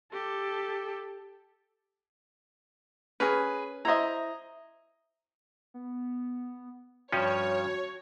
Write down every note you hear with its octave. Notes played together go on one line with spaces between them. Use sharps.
G4 A4
C#4 G#4 A#4 B4
E4 C5 D#5 E5 A#5
B3
G2 F3 C#4 F#4 C#5